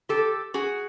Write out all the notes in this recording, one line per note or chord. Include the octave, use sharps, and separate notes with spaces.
G4 A4
F#4 G#4